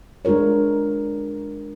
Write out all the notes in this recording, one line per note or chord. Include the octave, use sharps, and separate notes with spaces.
G#3 D4 F4 A#4 C#5